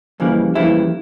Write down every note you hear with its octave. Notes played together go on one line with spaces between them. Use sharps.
F2 C#3 E3 G3 A#3
F2 C#3 E3 G3 A#3 E4